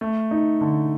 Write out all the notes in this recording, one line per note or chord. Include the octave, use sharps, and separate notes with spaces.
A3
D#4
D3